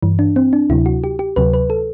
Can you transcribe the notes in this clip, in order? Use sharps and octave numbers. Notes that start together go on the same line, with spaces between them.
G2 E3
D4
C4
D4
D2 C3 F#3 E4
F#4
G4
G4
D2 C3 F#3 B4
B4
A4